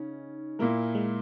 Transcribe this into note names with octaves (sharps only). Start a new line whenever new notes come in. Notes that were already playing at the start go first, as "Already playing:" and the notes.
Already playing: C#3 C#4 D#4
A#2 G#3 A#3 E4 A#4
G#3